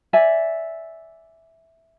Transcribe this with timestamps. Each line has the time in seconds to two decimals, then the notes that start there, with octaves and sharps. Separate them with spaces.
0.13 D5 E5 G#5